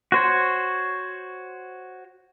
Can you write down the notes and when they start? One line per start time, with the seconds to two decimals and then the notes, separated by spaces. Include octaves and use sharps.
0.12 F#4 C5 C#5